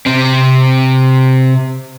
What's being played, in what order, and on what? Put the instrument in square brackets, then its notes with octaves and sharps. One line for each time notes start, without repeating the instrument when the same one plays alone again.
[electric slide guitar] C3 C4